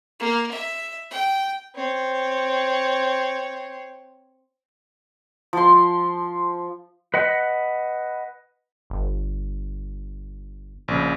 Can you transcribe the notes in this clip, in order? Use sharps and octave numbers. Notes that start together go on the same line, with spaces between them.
A#3
E5
G5
C4 C#5
F3 C6
B4 D#5 F#5
G1
A#1 C#3